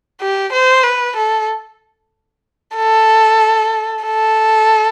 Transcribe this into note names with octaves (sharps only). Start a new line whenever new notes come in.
G4
C5
B4
A4
A4
A4